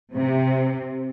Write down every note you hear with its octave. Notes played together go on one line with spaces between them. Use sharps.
C3